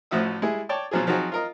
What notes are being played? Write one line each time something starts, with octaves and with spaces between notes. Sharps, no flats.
A1 A2 F3 F#4 E5 D#6
G3 G#3 E4 G#4
C#5 D5 G5 A5 D6
B2 F3 F#3 F4 G#4
F3 F#3 C4 D#4 F#4 G#4
F4 A#4 D#5